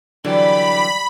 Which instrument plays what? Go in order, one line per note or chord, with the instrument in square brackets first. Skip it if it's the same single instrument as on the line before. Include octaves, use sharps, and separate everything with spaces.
[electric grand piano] D3 E3 F#3 [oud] G3 [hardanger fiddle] G4 D5 [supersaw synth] B5